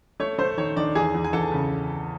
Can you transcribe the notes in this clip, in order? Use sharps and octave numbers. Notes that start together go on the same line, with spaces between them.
A3 C#5
A3 C5
D#3 C#5
D#3 D4 D5
E2 G#4 G#5
E2
G#5
E2 A4 A5
C#3